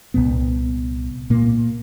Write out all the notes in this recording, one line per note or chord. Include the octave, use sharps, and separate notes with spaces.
C2 G2 A#2 B3
A#2 A#3